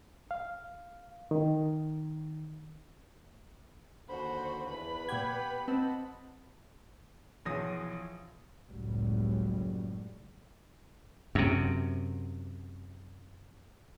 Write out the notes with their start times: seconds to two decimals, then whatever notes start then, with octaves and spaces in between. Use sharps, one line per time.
0.31 F5
1.31 D#3
4.09 D#2 D3 F#4 C5 B5
4.69 E2 B4 B5
5.09 A#2 B3 G4 F#5 G#6
5.68 C4 D#5 F#5 A5
7.45 B1 E3 F3 G#4 D#6 A#6
8.68 F#1 C#2 A2 F#3 G3
11.35 F#2 C3